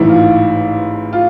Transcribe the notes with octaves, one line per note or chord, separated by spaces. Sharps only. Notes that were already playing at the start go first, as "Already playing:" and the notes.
Already playing: A1 G#2 E3 E4
F4
F4